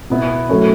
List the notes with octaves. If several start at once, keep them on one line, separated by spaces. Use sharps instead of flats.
B2 B3 E4
F#3 A3 C#4 E4 C#5